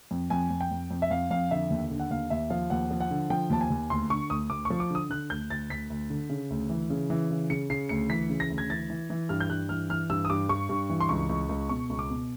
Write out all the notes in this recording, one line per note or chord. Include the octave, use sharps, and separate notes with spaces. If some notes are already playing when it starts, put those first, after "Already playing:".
F2
F2 G#5
F2
G5
F2
F2
E5
F2 F5
F2 F5
D3 E5
D#2
D3
F#5
D#2 F5
D#2 E5
F3 F5
D#2 F#5
F3
F#5
D3
F3 G5
D#2 A5
G#5
D#2
D2 C6
D3 C#6
D2 D#6
D2 D6
C#6
F3
D6
D3 D#6
D3 F#6
D2 G6
D2 A6
D2 B6
D2
D3
C#3
D2
E3
C#3
E3
C#3
C#3 C#7
C#3 C7
D2 C#7
E3 B6
C#3
A#6
D2
G#6
E3 A6
E3
E3
G2 F6
G6
G2 F#6
E3 F6
E3 F6
G2 E6
D#6
G2 D6
G2 C#6
G2
E3
C6
C#2 C#6
C#2
C#2
B2 C#6
C#2
D6
B2